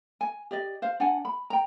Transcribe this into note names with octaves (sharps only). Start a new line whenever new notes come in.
G#5
G4 D5 D#5
C5 F5
D4 F#5 G#5
B5
G5 A#5